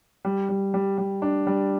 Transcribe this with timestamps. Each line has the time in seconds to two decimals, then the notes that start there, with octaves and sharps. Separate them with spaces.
0.25 G3
0.49 G3
0.74 G3
0.98 G3
1.22 D4
1.47 G3